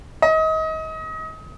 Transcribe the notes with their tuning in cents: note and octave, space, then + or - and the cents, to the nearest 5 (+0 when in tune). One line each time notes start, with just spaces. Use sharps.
D#5 +30